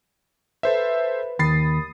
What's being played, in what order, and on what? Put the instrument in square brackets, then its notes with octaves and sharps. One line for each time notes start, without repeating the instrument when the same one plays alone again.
[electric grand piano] A4 C5 E5 [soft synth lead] B4
[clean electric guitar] D#2 [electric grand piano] B5 A6 C7 [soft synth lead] D#6